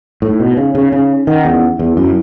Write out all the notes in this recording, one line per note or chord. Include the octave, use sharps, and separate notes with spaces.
A2 D#4
B2
C#3 D#4
C#3
C#3 C#4
D#3 F#5
E2
E4
E2
F#2 E4